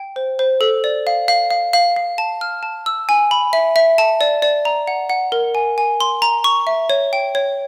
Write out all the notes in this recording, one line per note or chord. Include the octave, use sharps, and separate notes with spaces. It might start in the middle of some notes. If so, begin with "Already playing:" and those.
Already playing: G5
C5
C5
A4
D5
F5
F5
F5
F5
F5
A5
F6
A5
E6
G#5
B5
E5
E5
A5
D5
D5
A#5
F#5
F#5
A#4
G#5
G#5
C6
A#5
C#6
E5
C#5
G5
C#5